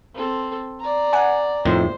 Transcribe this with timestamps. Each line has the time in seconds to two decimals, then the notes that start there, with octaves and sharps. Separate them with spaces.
0.14 C4 A4
0.80 D5 A#5
1.13 F#5 G#5
1.65 F2 A2 D#3 C5